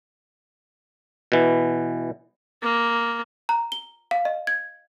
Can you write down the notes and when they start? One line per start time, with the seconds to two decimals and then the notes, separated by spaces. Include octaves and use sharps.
1.32 B2 E3
2.62 A#3
3.49 A#5
3.72 G7
4.11 F5
4.25 D#5
4.47 G#6